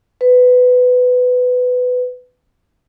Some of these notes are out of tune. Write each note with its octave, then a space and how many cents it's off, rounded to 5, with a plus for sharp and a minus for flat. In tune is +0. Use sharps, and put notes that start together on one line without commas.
B4 +15